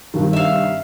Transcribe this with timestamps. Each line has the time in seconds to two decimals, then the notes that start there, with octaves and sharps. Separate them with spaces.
0.14 G2 C3 D#3
0.33 E5 F5